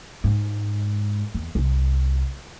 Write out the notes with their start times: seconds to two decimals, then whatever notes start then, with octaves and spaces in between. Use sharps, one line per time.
0.24 G#2
1.34 E2
1.55 C2